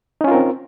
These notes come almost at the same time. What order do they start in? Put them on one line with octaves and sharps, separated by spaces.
D#4 C#4 F4 A#4 C4